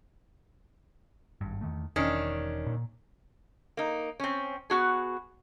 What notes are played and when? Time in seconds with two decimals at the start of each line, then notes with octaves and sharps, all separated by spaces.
1.41 G#1 G2
1.61 E2 D#3 A3
1.96 E1 D#3 C#4 D4
2.66 A#2
3.77 A#3 D#4
4.20 C4 C#4
4.70 B3 F#4 G#4